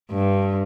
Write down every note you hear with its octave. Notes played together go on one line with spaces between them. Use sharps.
G2